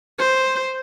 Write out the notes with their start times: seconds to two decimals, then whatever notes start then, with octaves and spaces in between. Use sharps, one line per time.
0.19 C5